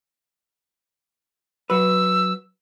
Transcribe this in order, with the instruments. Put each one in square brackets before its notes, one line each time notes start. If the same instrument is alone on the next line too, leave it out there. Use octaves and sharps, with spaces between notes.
[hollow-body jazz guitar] F#3 B4 [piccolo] E6